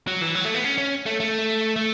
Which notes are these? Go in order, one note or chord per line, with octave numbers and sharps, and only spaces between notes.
F#3
E3
F#3
A3
B3
C#4
C#4
A3
A3
A3